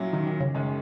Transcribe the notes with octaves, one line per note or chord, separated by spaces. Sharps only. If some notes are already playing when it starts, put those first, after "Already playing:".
Already playing: A#2 F#3 C#4 E4
D#3
D#3
C#3
F#2 D#3 G#3 C#4